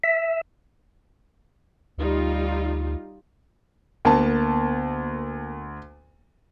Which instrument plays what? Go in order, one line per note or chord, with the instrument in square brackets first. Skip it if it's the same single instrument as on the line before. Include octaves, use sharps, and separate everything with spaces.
[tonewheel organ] E5
[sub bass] D2 [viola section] G3 D#4 F4
[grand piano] D2 A5 [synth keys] A#3 B3 A#4